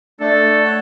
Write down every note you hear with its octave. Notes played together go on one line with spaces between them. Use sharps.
A3 D4 A4
C#5 F#5